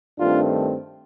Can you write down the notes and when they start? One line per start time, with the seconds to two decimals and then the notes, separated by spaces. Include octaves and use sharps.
0.19 G2 D#3 A3 C4 D4 F4